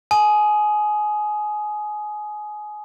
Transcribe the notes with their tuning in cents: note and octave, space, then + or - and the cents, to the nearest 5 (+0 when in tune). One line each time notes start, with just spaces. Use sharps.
G#5 +25 D#6 -5